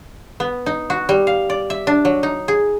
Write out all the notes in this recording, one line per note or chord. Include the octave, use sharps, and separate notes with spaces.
B3
D#4
F#4
G3
F5
D5
E5
D4
F#3
D#4
G#4